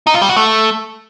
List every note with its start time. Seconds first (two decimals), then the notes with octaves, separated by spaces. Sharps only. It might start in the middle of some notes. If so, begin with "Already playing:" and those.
0.07 D#4
0.14 F4
0.22 G3
0.29 F#4
0.36 A3